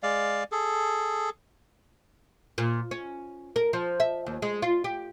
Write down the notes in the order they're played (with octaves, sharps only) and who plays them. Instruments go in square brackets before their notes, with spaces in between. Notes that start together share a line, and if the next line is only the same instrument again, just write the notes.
[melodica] G#3 D5 F5
G#4 A4
[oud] A#2
C#4
A#4
F3
E5
D#2
G#3
F4
G4